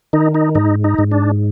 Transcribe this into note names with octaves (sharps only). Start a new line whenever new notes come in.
D#3 D#4
D#4
G#2 D#4
D#4
G#2
D4